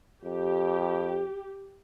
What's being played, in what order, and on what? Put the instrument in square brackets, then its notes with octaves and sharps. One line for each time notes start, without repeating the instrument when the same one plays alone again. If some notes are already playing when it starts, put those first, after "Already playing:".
[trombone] F2 [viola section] G4